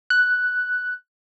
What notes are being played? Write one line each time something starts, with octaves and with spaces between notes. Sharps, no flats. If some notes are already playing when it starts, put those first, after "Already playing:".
F#6